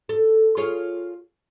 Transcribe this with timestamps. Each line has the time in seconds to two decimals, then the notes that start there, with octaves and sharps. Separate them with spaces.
0.09 A4
0.57 F4 G#4 C#5